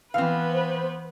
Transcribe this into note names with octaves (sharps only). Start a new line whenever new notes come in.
E3 B3 C4 B4 F5
C5